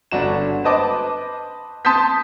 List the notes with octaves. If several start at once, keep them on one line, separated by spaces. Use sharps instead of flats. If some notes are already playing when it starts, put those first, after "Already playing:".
G1 D4 F#4 E7
B4 C5 D#5 A5 D6
A5 C6 D#6 G6 B6